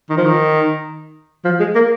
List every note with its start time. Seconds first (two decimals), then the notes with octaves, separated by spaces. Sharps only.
0.10 D#3
0.17 F3
0.25 D#3
1.45 F3
1.60 G#3
1.75 A#3